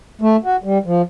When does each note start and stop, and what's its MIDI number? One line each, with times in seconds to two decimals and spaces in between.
0.21 0.37 57
0.44 0.56 66
0.64 0.78 55
0.86 1.02 53